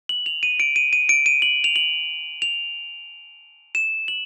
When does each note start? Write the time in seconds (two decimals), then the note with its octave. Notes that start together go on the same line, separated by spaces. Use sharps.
0.09 F#7
0.26 F7
0.43 D#7
0.60 D7
0.76 D#7
0.93 D#7
1.09 D7
1.26 D#7
1.42 F#7
1.64 F7
1.76 F#7
2.42 F7
3.75 E7
4.08 F#7